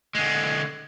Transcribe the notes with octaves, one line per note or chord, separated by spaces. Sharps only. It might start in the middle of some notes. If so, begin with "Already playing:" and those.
D3 G#3